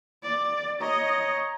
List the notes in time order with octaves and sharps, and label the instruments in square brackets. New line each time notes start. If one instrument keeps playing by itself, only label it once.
[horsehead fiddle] D5
[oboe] C#5 [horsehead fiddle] D#5 [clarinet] A#5